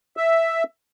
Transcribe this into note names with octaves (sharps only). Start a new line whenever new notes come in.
E5